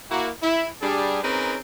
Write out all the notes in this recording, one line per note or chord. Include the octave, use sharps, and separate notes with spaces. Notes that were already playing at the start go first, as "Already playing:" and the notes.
A#3 E4 F#4
E4
G3 D4 G#4
C4 C#4 D#4 G#4 A#4 B4